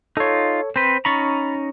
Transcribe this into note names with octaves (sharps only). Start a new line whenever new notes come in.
D#4 F4 A4 C#5
C4 B4 C5
C#4 D#4 A#5 B5 C#6 A6